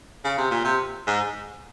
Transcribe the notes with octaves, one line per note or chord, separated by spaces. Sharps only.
C#3
C3
A#2
C3
G#2